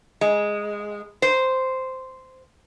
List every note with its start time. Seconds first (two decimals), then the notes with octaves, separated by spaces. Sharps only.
0.21 G#3
1.22 C5